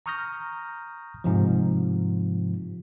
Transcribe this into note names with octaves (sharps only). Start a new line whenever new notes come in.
A#5 C#6 D#6 F6 G6 A#6
G#2 C3 F3